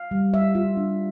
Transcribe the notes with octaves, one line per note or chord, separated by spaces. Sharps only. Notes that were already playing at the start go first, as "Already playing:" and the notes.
Already playing: F5
G3
G3 E5
F4
D4